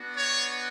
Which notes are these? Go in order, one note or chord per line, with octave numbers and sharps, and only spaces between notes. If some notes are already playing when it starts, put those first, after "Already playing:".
Already playing: B3 D4 F#4
C#5